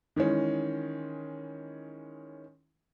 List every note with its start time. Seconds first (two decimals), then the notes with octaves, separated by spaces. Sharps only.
0.16 D#3 E3 G#3 C#4